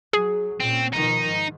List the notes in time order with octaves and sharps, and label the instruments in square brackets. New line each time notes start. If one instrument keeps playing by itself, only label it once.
[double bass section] F#3 [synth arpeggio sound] G#4
[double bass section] A#2 C#4 [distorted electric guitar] C4
[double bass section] B2 D#3 F3 [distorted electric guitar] D#4
[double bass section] G#2